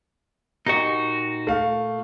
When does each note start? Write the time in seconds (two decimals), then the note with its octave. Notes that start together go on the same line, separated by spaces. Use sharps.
0.66 A#2 D#4 F#4 G4 D#5
1.47 A3 F5